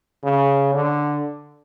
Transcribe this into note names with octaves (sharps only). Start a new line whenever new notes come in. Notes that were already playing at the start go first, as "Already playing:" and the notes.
C#3
D3